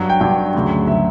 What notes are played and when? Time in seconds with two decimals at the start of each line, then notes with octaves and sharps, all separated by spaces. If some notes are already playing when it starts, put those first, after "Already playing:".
Already playing: G2 F#3
0.09 G5
0.21 G2 F#3 G5
0.54 D2 C#3 F#3
0.88 C#3 F#3 E5